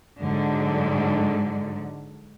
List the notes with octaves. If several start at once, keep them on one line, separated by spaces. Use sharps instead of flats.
G#2 D3 F#3